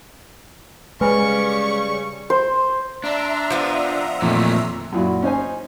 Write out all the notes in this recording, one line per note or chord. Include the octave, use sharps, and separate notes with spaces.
C#3 G3 G#3 B4 G#5 B5 C#6
C5
D4 E5 A#5 C6
F3 B3
F2 A#2 D#3 E3 A3
F#2 A#2 E4 F#4
C#4 D#4 C5 G#5